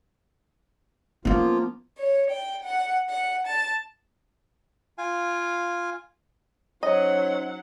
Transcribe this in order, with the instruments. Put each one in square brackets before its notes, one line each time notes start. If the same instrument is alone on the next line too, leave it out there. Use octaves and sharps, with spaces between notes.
[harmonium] F3 A#3 F4 [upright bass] B3 C#4
[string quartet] C#5
G5
F#5
F#5
A5
[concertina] F4 F5 G#5
[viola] F#3 F#5 [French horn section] C#4 D#4 C5 [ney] C#5 [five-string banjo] D#5